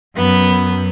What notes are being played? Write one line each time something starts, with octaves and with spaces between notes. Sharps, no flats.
F#2 B3